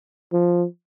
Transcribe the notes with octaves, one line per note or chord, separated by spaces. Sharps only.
F3